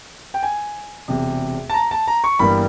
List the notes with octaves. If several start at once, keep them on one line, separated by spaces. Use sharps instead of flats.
G5
G#5
E1 E2 C3
A5
A#5
A5
A#5
C#6
G1 G2 E3 G3 A#3 B5